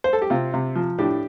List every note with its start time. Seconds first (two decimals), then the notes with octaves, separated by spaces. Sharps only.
0.04 C5
0.13 A4
0.22 G4
0.30 C3 C4 F4
0.54 C3
0.75 F3
0.98 A2 D4 G4